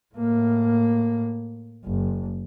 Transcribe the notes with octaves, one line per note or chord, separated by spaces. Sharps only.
A2 A#3
F#1